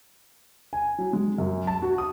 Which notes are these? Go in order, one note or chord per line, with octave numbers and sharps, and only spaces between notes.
G#5
F#3
G#3
F#2
A5
F#4
D#6